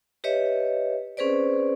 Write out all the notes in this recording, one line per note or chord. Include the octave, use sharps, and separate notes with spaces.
G4 B4 C#5 D#5 E5
C4 C#4 G#4 B4 C5 D5